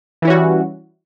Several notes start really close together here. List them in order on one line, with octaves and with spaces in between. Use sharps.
E3 E4 C#4 F#4 G3